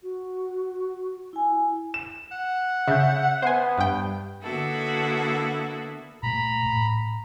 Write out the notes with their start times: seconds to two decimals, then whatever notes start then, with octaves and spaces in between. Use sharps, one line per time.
0.03 F#4
1.33 E4 G#5
1.94 E7
2.32 F#5
2.88 C#3 E5 G6
3.42 B3 C5 G#5
3.78 G2 G5
4.41 D3 A#3 B3 E4 F#4 A4
6.23 A#2 A3 A#5 B5
6.66 A2